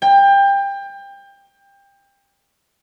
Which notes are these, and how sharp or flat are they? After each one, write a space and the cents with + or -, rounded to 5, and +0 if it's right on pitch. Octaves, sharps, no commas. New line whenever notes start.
G5 +25